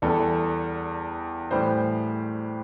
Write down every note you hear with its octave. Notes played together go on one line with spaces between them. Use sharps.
E2 E3 G3 A4
A2 E3 G3 C5